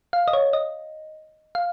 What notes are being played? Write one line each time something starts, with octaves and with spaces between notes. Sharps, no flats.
F5
D#5
C#5
D#5
F5